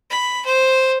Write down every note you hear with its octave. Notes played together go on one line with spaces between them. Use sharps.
B5
C5